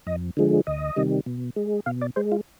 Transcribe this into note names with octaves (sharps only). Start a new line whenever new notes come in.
F2 D#5
D3 F3 G#3
D2 D#5
C3 D#3 G3
B2
G#3
B2 F5
D5
G#3 C5
F4